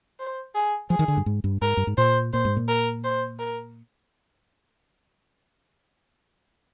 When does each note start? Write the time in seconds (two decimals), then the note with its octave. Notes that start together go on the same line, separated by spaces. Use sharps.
0.20 C5
0.55 G#4
0.90 F3 G#4
0.99 D#3
1.08 D3
1.17 G2
1.26 G#2
1.44 G2
1.62 G#2 A#4
1.77 G2
1.87 G#2
1.97 A#2 C5
2.33 A#2 C5
2.45 G#2
2.57 A#2
2.68 A#4
3.04 C5
3.39 A#4